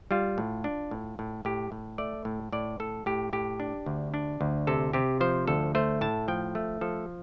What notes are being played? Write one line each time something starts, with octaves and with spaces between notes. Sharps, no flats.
G3 F4
A2
D4
A2
A2
A2 G4
A2
A3 D5
A2
A2 D5
A2 A4
A2 G4
A2 G4
D4
D2
D4
D2
C3 A4
C3 G4
F3 C5
D2 A4
A3 C5
A2 A5
F3 G5
A3
F3 A4